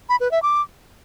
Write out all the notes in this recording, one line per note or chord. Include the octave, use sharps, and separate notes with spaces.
B5
B4
E5
D6